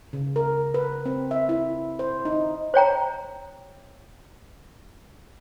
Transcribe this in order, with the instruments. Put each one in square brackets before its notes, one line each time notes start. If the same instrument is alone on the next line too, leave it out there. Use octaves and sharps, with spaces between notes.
[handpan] C#3
A#4
B4
C4
E5
E4
C5
D#4
[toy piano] C5 C#5 G5 A#5